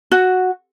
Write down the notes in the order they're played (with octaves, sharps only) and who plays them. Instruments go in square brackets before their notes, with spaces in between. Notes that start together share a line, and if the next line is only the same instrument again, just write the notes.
[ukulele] F#4